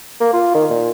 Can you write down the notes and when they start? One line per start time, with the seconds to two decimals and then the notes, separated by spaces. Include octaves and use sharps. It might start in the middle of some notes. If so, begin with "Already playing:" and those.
0.21 A#3
0.33 F4
0.55 D#3
0.70 A#2